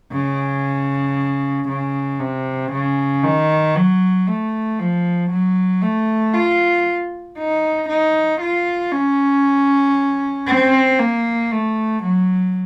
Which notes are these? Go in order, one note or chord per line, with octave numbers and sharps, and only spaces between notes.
C#3
C#3
C3
C#3
D#3
F#3
A3
F3
F#3
A3
F4
D#4
D#4
F4
C#4
C4
A#3
A3
F#3